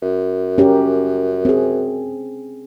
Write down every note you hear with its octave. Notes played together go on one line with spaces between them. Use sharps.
F#2
C#4 G4 A#4
C4 G#4